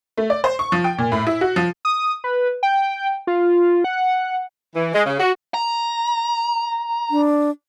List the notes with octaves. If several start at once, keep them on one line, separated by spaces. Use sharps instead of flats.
A3
D5
C5
C#6
F3
G5
A#2
A2
E4
F#4
F3
D#6
B4
G5
F4
F#5
E3
G#3
C#3
F#4
A#5
D4